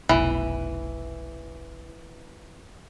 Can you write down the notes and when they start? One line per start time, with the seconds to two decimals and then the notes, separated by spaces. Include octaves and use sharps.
0.09 F1 B1 E3